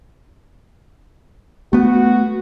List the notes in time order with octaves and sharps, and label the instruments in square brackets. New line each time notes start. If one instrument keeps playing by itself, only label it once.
[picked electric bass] A3 B3 [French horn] F#4